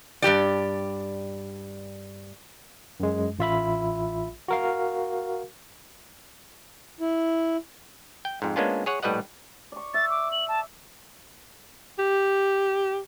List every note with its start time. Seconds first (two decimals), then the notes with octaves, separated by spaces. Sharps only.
0.22 G2 C#3 G4 D5
3.00 F#2 G#3
3.39 A1 F4 E5 B5
4.48 F#4 A#4 F5
7.00 E4
8.25 G5
8.42 F2 G#2
8.56 G#3 A#3 B3 C#4 D4 F4
8.86 G#4 C#5 F#5
9.03 A#1 A2 G3 B4 D#5 F#5
9.72 D5 C#6
9.94 E5 A6
10.10 D6
10.32 F#7
10.48 A5
11.98 G4